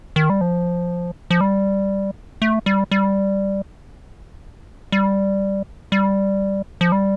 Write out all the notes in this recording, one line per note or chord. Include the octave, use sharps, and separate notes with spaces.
D#3
G3
F3
F3
G3
A3
G3
G3
G3
G3
F3
G3